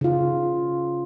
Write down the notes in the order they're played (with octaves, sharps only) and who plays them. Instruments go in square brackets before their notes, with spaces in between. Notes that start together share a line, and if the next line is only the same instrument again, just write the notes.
[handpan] C#3 F4